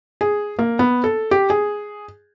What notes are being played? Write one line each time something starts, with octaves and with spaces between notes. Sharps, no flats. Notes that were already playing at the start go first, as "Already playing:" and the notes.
G#4
A#3
B3
A4
G4
G#4